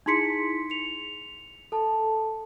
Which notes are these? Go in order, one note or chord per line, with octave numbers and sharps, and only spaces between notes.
D#4 E4 G#4 C6 B6 C#7
C#7 F7
A4 A5